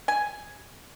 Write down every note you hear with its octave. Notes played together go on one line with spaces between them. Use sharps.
G#5